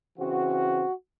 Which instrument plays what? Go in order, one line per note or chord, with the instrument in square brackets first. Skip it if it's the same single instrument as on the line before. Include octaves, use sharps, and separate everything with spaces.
[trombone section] C#3 E3 C4 F#4